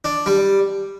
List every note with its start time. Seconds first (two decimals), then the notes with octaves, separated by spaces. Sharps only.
0.05 D4
0.26 G3